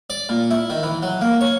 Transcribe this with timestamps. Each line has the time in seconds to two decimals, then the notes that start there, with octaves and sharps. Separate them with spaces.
0.10 D5
0.29 A#2
0.51 E4
0.70 D#3
0.83 E3
1.02 F#3
1.21 A#3
1.41 C#5